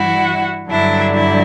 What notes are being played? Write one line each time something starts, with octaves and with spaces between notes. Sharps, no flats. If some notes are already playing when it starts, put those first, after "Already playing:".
Already playing: G2 E3 G3 E4 F#4
G2 D3 F#3 D4 E4
E4